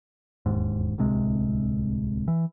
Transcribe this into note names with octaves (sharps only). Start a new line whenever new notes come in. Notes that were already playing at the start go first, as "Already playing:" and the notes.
E1 D#2 G#2
D1 C2 C3 G#3
E3